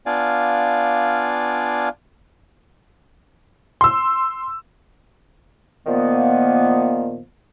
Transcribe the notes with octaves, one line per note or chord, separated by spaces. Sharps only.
B3 D4 F4 D5 F5 G#5
C6 E6
A#2 D#3 F3 A#3 B3